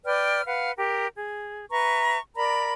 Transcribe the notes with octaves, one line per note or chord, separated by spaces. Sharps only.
B4 D5 G5 F6
B4 F5 F#5
G4 A#4
G#4
B4 E5 A#5 C#6
A#4 D5 A#5 B5